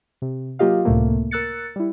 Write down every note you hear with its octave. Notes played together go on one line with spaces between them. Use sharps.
C3
F#3 A#3 F4 G4 D#5 F5
C#2 A2 C3 A3 A#3
A#4 E6 F#6 A6 C#7
G3 E4